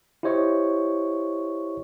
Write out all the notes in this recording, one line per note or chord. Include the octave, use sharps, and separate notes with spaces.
E4 G4 C5 C#5 D#5 C#6